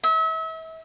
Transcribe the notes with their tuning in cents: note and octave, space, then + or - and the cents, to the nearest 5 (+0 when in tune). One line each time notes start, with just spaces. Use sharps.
E5 -35